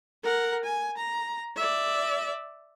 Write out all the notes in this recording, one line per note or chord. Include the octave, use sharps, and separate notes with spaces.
A#4 F#5
G#5
A#5
D5 E5